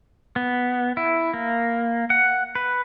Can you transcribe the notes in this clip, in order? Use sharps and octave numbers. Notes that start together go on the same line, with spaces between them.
B3
E4
A#3
F#5
B4